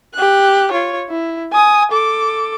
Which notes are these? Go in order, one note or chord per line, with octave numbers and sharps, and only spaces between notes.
G4 F#6
F4 C#5
E4
G#5 D#6
A4 D6